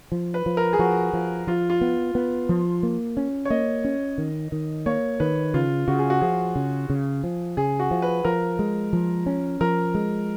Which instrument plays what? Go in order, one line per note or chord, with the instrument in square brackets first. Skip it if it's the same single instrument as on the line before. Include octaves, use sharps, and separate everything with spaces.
[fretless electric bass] F3
[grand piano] B4
[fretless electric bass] F3
[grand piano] A#4
G#4
[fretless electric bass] F3 [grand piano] F#4
[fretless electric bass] F3
[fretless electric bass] F3 [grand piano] F4
[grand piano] F4
[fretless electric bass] B3
B3
F3
A#3
C#4
[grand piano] C#5
[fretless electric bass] A#3 [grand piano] D#5
[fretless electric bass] C#4
D#3
D#3
[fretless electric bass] A#3 [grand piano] C#5
[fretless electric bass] D#3 [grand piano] B4
[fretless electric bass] C#3 [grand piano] F4
[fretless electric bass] C#3 [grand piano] F#4
[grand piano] G#4
F#4
[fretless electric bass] F3 [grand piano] G#4
[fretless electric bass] C#3
C#3
F3
[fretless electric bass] C#3 [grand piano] G#4
[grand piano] F#4
[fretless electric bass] F3
[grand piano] B4
[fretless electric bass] F3 [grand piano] A#4
[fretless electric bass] G#3
F3
C#4
[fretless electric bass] F3 [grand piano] A#4
[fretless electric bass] G#3